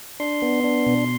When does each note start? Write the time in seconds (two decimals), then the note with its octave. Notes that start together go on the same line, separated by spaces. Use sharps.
0.20 D4 C6
0.42 B3
0.64 D4
0.86 B2